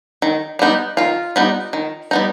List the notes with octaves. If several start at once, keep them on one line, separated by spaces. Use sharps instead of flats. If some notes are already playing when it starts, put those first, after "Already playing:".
D#3
G3 B3 D#4
D#3 F4
G3 B3 D#4
D#3
G3 B3 D#4